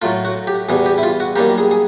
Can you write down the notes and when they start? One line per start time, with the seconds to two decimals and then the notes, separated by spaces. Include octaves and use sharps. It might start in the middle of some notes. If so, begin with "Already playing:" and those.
0.02 A2 F#3 A3 F4
0.25 F#4
0.47 G4
0.69 E2 B2 G3 G#4
0.86 G4
0.98 E4
1.03 F4
1.20 F#4
1.36 F#2 D#3 G3 A#3 G4
1.58 G#4
1.71 G#4